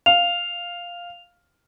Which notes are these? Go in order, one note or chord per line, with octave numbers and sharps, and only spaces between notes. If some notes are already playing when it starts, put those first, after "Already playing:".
F5 F7